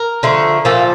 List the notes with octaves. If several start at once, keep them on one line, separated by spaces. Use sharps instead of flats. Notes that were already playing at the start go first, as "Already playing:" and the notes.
Already playing: A#4
D3 F3 A3
A#2 F3 A#3 A4